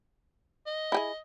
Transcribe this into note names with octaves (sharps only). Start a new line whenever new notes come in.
D#5
E4 G4 G#4